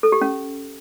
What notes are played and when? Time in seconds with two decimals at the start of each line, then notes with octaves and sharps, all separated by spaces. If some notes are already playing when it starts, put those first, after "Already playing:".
0.03 A4
0.12 G4
0.21 C#4